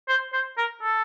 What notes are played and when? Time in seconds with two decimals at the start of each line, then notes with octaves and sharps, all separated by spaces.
0.08 C5
0.33 C5
0.58 A#4
0.82 A4